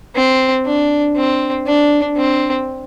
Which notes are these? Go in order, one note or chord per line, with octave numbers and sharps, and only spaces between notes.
C4
D4
C4
D4
C4